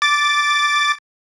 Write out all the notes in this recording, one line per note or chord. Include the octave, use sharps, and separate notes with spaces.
D6 A6